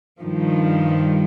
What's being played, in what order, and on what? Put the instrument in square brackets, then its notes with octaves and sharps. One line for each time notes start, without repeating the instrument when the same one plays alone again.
[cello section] G2 D#3 F3